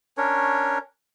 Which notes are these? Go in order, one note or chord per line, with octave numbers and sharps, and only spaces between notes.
C#4 D4 A#4 C#5